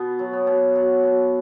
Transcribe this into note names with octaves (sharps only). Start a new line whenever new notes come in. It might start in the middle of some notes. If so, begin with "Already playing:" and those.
Already playing: B2 B3
F#3
B3
B2
F#3
B2